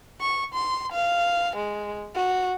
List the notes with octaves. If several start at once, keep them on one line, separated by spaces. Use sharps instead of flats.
C#6
C6
F5
G#3
F#4